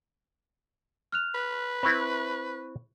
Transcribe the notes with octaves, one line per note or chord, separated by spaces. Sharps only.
F6 F#6 F7
B4
C4 E4 B5 C#6 F#6